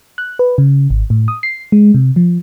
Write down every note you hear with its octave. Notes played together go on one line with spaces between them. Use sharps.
F#6
B4
C#3
G#1
A2
D#6
C7
G#3
C3
F3